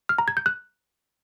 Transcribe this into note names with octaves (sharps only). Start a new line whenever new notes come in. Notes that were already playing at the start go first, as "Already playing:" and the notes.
F6
A#5
G#6
G6
F#6